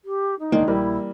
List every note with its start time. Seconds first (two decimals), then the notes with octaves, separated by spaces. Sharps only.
0.05 G4
0.39 D#4
0.52 D1 C2 D#3 G#3 A#3 D4
0.68 A#1 E3 G3 A#3 E4